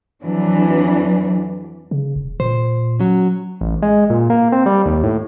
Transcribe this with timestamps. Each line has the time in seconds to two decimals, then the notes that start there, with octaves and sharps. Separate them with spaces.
0.22 F2 E3 F#3 D4
1.91 C#3
2.16 E1
2.40 A#2 C5
2.99 F#3 C#4
3.61 A1
3.82 G#3
4.10 A#2
4.30 A#3
4.52 C4
4.66 G3
4.86 D#2
5.03 A2